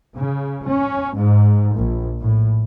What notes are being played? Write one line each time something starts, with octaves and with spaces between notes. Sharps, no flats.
C#3
C#4
G#2
A#1
A2